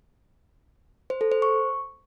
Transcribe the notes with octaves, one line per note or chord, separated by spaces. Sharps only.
C5
A4
C5
C#6